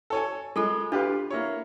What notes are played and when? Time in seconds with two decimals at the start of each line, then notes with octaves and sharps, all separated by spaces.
0.10 A4 C#5 G#5
0.56 G#3 F4 A4 A#4
0.92 D4 F4 G4 B4
1.30 A#3 E4 C#5